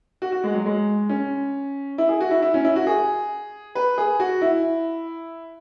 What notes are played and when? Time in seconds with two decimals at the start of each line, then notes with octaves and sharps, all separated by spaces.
0.22 F#4
0.32 F#4
0.44 G#3
0.54 F#3
0.65 G#3
1.09 C#4
1.98 E4
2.09 G#4
2.20 F#4
2.31 E4
2.42 E4
2.54 C#4
2.65 E4
2.76 F#4
2.87 G#4
3.75 B4
3.98 G#4
4.20 F#4
4.42 E4